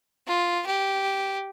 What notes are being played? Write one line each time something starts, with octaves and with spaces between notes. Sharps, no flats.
F4
G4